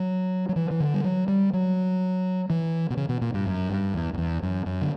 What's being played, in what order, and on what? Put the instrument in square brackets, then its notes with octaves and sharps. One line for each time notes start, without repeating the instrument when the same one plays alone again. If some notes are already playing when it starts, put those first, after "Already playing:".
Already playing: [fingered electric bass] F#3
F#3
E3
E3
D3
G3
F#3
G3
F#3
E3
B2
C#3
B2
A#2
G2
F#2
G2
E2
F#2
E2
F#2
F#2
D3